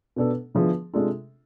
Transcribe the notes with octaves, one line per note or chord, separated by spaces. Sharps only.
B2 B3 D4 A4
D3 F3 B3 E4 G#4
C3 G#3 D4 F4 A4